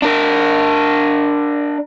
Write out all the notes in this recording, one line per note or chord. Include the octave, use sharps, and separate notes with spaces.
D4 A#4